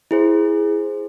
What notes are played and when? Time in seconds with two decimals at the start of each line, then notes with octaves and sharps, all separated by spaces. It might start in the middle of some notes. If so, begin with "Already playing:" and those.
0.11 E4 G#4 C5